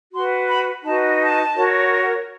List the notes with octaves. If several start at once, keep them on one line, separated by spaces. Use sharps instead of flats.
F#4 B4 C6
B5
D#4 F#4 B4 A5
A5
F#4 A#4 C#5